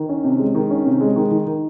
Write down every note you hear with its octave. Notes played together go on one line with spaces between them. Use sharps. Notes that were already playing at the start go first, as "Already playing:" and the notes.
Already playing: D#3
C#4
C3
G#3
D#3
C#4
C3
G#3
D#3
D#3
D#3